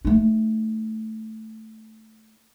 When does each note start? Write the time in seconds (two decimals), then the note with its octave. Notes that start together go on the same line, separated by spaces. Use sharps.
0.05 A3 D#4